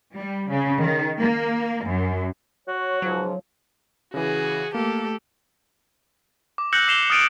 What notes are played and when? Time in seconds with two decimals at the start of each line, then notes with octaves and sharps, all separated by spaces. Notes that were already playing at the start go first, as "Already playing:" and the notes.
0.15 G3
0.50 C#3
0.81 D#3
1.21 A#3
1.85 F#2
2.68 F#4 C#5
3.02 C#2 G#2 F3 F#3
4.14 C#3 E3 F#4 G#4
4.74 A3 A#3 G4 A4
6.58 D6
6.72 E6 F#6 G6 A#6 C#7 F#7
6.88 E6 C7 E7 F7 G7
7.10 D#6 F6 A6 D7 D#7 F7